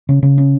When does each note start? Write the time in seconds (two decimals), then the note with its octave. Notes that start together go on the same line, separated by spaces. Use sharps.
0.09 C#3
0.23 C#3
0.38 C#4